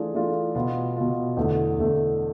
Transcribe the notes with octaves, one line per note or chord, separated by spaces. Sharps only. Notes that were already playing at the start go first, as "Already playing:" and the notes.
Already playing: E3 A3 D4 F4 G#4
E3 A3 D4 F4 G#4
B2 B3 F4
B2 B3 F4
E2 D3 A3
E2 D3 A3